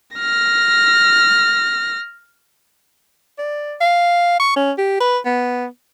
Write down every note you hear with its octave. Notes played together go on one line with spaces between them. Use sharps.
F6 A#6
D5
F5
C#6
C#4
G4
B4
B3